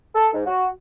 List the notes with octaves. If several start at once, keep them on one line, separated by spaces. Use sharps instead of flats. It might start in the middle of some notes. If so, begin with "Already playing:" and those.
A4
G#2
F#4